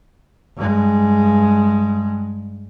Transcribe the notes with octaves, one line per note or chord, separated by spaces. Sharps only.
G2 G#3